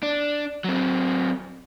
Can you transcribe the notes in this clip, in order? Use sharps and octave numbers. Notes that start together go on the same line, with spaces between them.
D4
F#3 C4